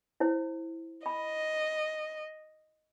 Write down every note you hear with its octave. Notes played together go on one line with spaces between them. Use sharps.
E4 C5
D#5 B5